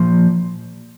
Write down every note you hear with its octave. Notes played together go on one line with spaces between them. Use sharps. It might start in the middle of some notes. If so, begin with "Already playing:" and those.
Already playing: A#2 F3